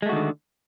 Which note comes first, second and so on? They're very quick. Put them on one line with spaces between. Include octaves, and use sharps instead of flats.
G#3 A3 F#4 D#3 D3